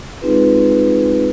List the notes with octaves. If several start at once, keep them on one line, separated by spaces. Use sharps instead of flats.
G#3 C4 D#4 F4 G#4 B4